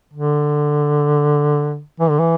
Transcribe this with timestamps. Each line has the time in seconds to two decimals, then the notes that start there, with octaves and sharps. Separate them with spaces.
0.14 D3
2.00 E3
2.10 D3
2.19 E3